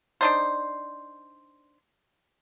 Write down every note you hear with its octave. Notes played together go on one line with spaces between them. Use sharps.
D4 D#4 C5